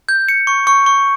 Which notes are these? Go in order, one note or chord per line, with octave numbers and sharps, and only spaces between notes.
G6
C#7
C#6
C#6
C#6